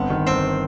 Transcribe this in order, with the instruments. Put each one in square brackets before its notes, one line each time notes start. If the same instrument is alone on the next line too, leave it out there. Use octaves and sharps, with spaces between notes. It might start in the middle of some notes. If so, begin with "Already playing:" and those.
Already playing: [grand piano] G1 C4 [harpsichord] B3
[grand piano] D#3
[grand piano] G1 [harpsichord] C4